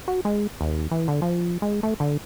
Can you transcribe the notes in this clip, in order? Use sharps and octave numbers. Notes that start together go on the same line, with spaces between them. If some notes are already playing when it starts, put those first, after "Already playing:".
F#4
G#3
D#2
E3
D3
F3
G#3
A3
D3